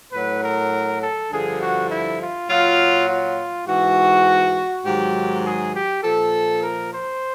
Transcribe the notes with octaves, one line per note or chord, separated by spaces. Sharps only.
A2 F#3 B4
A#4
A4
G2 D3 F3 G#4
F#4
E4
F4
A#2 F#3 F4
F4
G#2 E3 F#4
G#2 D#3 F#3 G4
G#4
G4
A#2 F3 A4
A#4
C5